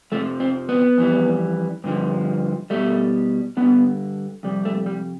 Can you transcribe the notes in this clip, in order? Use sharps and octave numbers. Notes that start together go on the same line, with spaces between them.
F2 C3 F3 A3
C4
B3
F2 E3 G3
G2 D3 F3
B2 G3 A3
G2 D3 F3 B3
F2 C3 G3
A3
G3